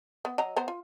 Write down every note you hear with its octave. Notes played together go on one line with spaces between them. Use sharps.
B3
F#3 D#5 A#5
B3 C5 A#5
F4